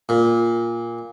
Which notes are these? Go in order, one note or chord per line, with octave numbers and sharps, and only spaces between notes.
A#2